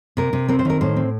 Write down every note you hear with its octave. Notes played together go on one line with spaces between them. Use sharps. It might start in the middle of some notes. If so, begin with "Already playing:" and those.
C3 A#4
C3
C4 A#4
C5
D#3 A#4
A2 C5
C4